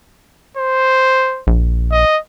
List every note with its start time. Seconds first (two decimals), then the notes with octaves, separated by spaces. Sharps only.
0.57 C5
1.47 A#1
1.92 D#5